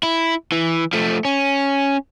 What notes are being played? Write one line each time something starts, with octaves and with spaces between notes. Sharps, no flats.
E4
E3
F3 A3
C#4